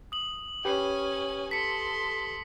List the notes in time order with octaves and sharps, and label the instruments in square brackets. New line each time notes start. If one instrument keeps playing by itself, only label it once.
[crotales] D#6 F#7
[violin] C#4 G#5 [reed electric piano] G4 B4
[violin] A4 C6 [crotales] B6 C#7